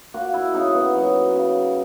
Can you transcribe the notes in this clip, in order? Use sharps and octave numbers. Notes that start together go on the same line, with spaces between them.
A#3 F#4
E4
C#3 D#4
B3
F#3
C#3